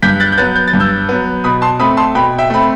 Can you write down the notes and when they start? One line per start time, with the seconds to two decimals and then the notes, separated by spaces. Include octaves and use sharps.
0.02 G2 G6 B6
0.20 F#6 A6
0.32 G6
0.38 F#3 B3 F#6 A6
0.56 G6
0.68 A6
0.73 G2
0.80 E6 G6
1.09 F#3 B3
1.44 B2 B5 D#6
1.62 A5 C6
1.79 A3 C4 B5 D#6
1.97 A5 C6
2.15 B2 G5 B5
2.38 E5 G5
2.50 A3 C4 B5